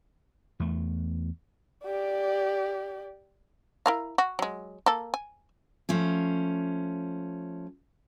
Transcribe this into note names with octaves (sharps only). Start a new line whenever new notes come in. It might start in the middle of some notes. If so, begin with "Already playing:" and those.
E2 A3
G4 D5
E4 A#4 F5
F#4
F#3 G#3
A#3 A4
G#5
F3 A3 C#4